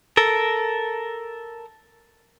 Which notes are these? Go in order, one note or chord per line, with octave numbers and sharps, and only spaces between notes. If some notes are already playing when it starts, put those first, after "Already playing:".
A4 A#4